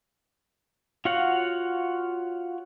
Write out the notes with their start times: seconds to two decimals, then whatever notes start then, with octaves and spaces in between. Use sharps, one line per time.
1.05 F4 F#4 C#5 F5 F#5